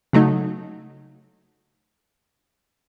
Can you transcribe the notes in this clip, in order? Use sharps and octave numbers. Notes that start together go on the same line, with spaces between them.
C#3 F#3 A3 D#4